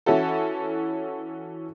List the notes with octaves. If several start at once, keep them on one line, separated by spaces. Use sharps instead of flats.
E3 C#4 E4 F#4 A4